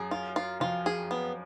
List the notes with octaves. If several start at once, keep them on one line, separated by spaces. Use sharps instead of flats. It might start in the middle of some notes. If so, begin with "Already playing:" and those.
Already playing: F#2 G#4
F4
F4
F2 F4
G#4
B3